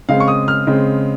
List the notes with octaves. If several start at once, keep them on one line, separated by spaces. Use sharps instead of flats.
C#3 G#3 C4 F5
C#6
D#6
F6
C#3 G#3 C4